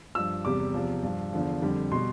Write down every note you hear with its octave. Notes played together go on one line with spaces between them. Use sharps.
G2 F3 E6
E2 C3 G3 D6
E2 C3 F3
G2 F3
E2 D3 F3
F2 D3 G3
B2 G3 C6